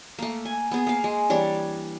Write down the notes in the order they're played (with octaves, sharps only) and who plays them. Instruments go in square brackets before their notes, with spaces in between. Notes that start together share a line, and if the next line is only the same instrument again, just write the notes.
[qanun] A3 A#3
G#5
B3 G#4
A#3 F5
G#3
E3 G3 D4 C#5